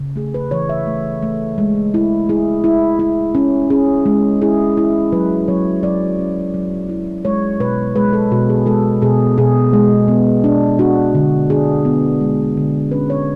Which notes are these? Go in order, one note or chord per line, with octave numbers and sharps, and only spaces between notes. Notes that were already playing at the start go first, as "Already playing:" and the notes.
Already playing: C#3
A3 G#4
B4
E3 C#5
E5
A3
A3
G#3
E4
E4 G#4
E4
E4
C#4
C#4 G#4
G#3
E4 G#4
E4
F#3 B4
F#3 C#5
F#3 D5
C#4
F#3
E4
G#3 C#5
B2 B4
G#3 B4
A4
B2 F#4
G#4
G#3 A4
B2 G#4
B2 G#4
G#3
B3
D4
D4 F#4
D3
D4 G#4
B3
G#3
D3
C#4 B4
C#5